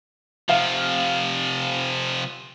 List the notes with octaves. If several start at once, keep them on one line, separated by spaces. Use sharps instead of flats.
C3 F3 F5